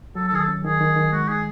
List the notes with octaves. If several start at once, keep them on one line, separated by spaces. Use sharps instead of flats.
F#3 A4
A4
D#3 G#4
A4
C#4
D#3 G#4
D#3
D#3
G#3 F#4
D#4 G#4